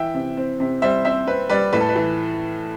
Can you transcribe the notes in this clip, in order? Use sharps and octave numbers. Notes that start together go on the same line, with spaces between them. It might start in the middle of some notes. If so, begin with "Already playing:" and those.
Already playing: E3 E5 G5
C3
C4
C3
G3 C5 E5
C4 C5 E5
C4 B4
G3 B4 D5
A2 B4
A4
B4
E3